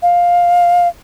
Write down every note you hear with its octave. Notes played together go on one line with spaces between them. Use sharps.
F5